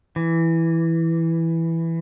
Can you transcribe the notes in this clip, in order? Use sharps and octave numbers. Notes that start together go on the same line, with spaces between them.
E3